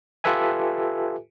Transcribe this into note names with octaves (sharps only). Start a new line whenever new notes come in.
F4 G4 A4 B4 E5 G#5